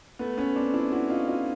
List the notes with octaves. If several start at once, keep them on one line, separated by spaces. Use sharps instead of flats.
A3 B3
B3 C#4
C4 D4
D4 E4
E4 F#4
D#4 F4
D#4 F4